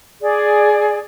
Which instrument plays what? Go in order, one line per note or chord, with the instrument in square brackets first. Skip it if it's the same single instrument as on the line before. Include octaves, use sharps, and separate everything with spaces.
[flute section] G#4 D5